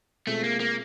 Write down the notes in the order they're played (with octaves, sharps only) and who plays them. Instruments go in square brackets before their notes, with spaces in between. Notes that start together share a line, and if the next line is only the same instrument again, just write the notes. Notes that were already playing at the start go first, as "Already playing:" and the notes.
[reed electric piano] B2 G#3 C4 F4 G#4 [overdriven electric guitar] A3
[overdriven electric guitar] A#3
A#3